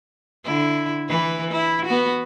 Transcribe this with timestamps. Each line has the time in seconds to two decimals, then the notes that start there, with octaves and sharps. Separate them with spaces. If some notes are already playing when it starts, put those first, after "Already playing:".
0.44 D3 E4
1.08 E3 B4
1.51 E4
1.85 B3 F#4